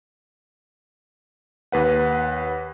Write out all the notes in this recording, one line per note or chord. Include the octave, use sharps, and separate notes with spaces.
D#2 B4 F#5